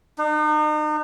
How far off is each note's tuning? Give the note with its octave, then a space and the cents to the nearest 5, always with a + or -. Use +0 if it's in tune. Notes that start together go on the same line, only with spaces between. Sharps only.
D#4 -40